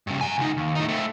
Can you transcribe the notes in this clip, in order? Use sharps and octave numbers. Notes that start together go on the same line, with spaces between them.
G2 C#3
F#5 G#5
C#2 D#4
D#2
A2 D#4
A3 C4